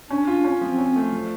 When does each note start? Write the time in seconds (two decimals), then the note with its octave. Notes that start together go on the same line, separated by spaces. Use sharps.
0.10 C#4 D4
0.27 F4
0.45 C#4
0.61 F3 C4
0.78 C#4
0.96 A3
1.13 F3